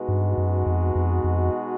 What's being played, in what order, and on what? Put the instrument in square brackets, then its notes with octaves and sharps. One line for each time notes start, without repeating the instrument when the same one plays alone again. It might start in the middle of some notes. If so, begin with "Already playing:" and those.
Already playing: [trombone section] B2 G#3 B3 D#4 F#4
[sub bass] G2
F#2
F2
F2
F2